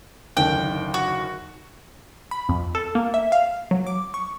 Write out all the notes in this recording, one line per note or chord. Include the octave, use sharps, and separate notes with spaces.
F#1 D#2 D3 G5
F#4
B5
F2
A4
A#3
E5
F5
F#3
D6
C#6